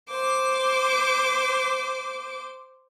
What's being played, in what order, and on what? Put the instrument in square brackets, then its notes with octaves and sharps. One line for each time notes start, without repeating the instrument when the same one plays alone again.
[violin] C5 D6